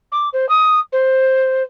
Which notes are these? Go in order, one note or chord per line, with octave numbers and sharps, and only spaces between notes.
D6
C5
D#6
C5